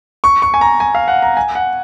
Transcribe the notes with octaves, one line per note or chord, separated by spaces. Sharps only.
C#6
C#6
G#5
A#5
G#5
F5
F#5
A#5
G#5
F#5